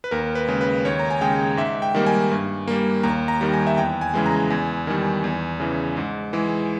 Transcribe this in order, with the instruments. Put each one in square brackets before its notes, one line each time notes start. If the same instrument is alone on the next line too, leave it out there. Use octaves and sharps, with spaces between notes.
[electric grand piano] B4
D#2 A#4
B4
C#3 G#3
B4
D#2 C#5
A#5
G#5
C#3 G#3 G5
G#2 E5
G5
D#3 G3 A#3
G#5
G2
G3 A#3
D#2 A#5
A#5
D#3 G3
G#5
E5
E2 G5
G#5
C#3 E3 G#3
A#5
E2 G#5
D#3 G3
E2
C#3 E3
G#2
E3 G#3